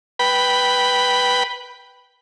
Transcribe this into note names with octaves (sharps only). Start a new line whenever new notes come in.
B4 G5 B5